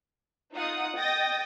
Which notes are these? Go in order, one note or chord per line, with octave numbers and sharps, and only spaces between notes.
D#4 F4 F#5 D#6
D#5 G5 D#6 A6 A#6